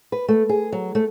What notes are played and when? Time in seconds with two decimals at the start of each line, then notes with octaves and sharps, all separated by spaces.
0.12 B4
0.28 A3
0.49 G#4
0.72 F#3
0.95 A3